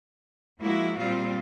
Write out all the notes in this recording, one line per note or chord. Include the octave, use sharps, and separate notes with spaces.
F3 G#3 A#3 E4 F#4
A#2 G3 C4 F4